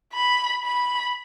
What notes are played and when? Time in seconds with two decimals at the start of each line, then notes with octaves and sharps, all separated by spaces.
0.14 B5
0.64 B5